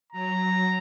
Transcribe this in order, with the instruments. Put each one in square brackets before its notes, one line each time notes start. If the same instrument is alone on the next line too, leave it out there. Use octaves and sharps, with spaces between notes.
[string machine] F#3 [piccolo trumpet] A#5